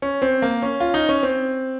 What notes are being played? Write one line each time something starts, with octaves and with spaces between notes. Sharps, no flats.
C#4
C4
A#3
C#4
F4
D#4
C#4
C4